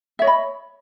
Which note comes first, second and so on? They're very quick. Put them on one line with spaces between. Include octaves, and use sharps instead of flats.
E5 C#5 D#5 B5